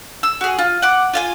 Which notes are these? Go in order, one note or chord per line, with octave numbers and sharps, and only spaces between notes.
E6
F#4 G#4
F4
F#5 D6
F4 F5 G#5